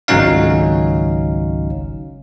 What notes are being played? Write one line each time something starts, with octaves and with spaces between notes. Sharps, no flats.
G#1 C#2 F#3 C#4 D#4 F5